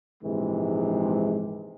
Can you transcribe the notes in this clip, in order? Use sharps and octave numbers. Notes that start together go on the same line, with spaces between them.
A#1 G#2 C3 E3 G#3